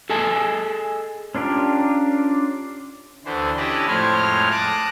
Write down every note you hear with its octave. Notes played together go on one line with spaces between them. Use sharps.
G#4 A4 D#5 G#5 A5
C#4 D4 F4 G4 A#4
D2 D3 E3 C5
C#4 D4 E4 G4 B4 D#5
F2 A2 G#3 C5 C#5 F6
A5 D6 D#6 F#6 A#6